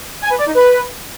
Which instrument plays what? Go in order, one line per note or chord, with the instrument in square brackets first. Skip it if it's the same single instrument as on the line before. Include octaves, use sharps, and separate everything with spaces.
[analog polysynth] G#5
B4
D5
D#4
B4